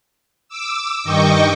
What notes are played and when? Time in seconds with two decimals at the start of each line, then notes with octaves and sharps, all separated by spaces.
0.49 D6 E6
1.04 G2 D#3 D#5 G5 C#6 D6